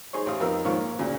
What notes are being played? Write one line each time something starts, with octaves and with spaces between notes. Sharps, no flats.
D#4 G#4 C5 C#5
A1 C5 F5 D#6
F2 B3 D#4 A#4 F5 E6
G#2 D#3 F3 A#3 C#5 F5
A#3
D2 A#2 C#3